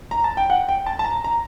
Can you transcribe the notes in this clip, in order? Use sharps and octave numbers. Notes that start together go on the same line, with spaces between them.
A#5
A5
G5
F#5
G5
A5
A5
A#5
A#5